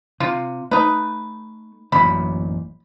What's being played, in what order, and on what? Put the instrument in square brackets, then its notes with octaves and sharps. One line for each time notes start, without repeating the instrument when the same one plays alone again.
[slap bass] C3 [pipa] F4
[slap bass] A3 [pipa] D#4 B4
[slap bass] A1 F#2 A#2 [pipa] B5